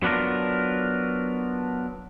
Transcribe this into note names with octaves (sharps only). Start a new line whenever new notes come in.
F#3 B3 D4 F4 A#4